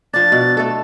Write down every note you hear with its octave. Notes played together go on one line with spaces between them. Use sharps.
F3 D4 A6
B2
A3 A4